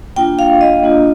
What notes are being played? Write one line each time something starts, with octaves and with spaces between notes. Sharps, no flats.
A#3 D4 F4 G5
F5
D#5
A#3 D4 F4